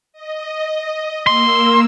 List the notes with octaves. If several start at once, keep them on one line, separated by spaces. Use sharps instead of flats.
D#5
A#3 C6 E6